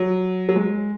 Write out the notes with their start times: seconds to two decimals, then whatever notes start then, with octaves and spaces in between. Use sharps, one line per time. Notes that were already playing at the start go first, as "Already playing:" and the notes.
Already playing: F#3
0.49 F#3
0.56 G#3